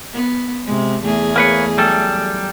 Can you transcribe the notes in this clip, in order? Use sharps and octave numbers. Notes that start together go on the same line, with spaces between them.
B3
C3 G#3
E2 A3 G#4
A#3 B4 C#5
F#3 G3 A4